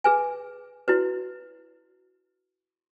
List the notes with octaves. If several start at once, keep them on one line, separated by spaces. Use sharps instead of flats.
G#4 B4 G#5
E4 F#4 B4